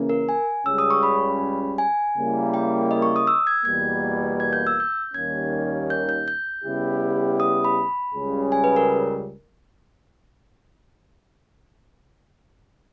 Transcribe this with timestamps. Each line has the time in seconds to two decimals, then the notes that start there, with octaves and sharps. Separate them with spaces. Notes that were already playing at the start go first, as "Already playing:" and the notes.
Already playing: C#3 E3 A#3 C#4
0.09 A#4
0.29 G#5
0.66 C#2 C#3 G3 C#4 G#4 E6
0.78 D#6
0.90 C#6
1.03 B5
1.78 G#5
2.16 C#3 G3 A#3 E4
2.54 G5
2.91 D#5
3.02 C#6
3.16 D#6
3.27 E6
3.47 G#6
3.65 E2 B2 G3 A#3 G#6
4.40 G#6
4.53 G6
4.67 E6
4.80 G6
5.14 D#2 D#3 G3 A#3 C#4 G#6
5.90 G6
6.09 G6
6.28 G6
6.64 C#3 G3 B3 E4 G4
7.40 D#6
7.65 B5
8.14 C#2 C#3 G3 C#4 G#4
8.52 G#5
8.64 B4
8.76 A#4